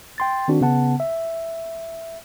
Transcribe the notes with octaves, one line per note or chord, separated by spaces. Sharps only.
G5 C6 A6
D#3 C4 D4 F#4
C#3 B3 F#5 A5
E5